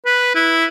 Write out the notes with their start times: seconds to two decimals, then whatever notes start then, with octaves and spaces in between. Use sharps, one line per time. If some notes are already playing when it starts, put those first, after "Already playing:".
0.06 B4
0.35 E4